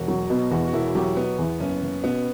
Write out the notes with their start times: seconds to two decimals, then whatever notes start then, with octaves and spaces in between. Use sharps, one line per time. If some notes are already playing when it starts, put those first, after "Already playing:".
Already playing: E1 F#4
0.08 F#3
0.30 B2
0.51 E2 F#4
0.67 F#4
0.73 E1 E4
0.95 F#3 G4
1.16 B2 B3
1.39 E2
1.60 F#1 C#4
1.82 F#1
2.04 B2 B3